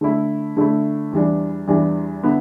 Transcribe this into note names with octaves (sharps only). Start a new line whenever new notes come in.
D3 A3 E4
D3 A3 E4
E2 E3 G3 D4
E2 E3 G3 D4
D3 B3 E4